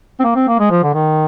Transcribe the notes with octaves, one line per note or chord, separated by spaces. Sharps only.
C4
A#3
C4
A#3
G#3
F3
D3
D#3